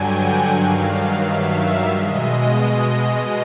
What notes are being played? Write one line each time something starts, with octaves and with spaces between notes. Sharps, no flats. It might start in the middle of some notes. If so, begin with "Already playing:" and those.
Already playing: G2 D3 F#3 G5 G#5
F#5
G2 D#3 F#3 F5
E5
B2 G#3 D#5